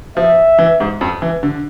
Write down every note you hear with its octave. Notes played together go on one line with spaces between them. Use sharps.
F3 E5
E3
G#2
F2
E3
D3